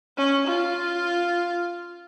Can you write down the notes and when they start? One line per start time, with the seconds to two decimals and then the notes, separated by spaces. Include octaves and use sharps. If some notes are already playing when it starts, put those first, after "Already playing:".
0.18 C#4
0.47 F4